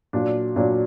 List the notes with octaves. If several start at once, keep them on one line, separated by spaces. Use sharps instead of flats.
A#2 F#3 D4
A#2 F#3 D4